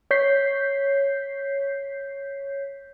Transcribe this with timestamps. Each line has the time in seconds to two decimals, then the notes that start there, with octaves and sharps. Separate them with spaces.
0.11 C#5 G6 B6 C7